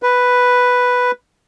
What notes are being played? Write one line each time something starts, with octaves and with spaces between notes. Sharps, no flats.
B4